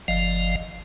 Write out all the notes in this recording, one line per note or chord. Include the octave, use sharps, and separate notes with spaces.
G1 F3 D#5 F5